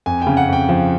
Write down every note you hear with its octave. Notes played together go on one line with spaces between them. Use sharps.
F2 G#5
C#3 G5
F#5
F2 G5
F3